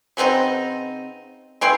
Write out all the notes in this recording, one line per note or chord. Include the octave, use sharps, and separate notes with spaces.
C#3 B3 C4 D#4
C#3 E3 G5 C6